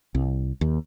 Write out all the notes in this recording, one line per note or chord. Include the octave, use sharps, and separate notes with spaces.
C2
D#2